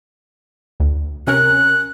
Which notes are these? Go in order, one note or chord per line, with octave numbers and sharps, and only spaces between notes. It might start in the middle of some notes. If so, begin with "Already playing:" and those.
D2
C3 C#4 A#4 F#6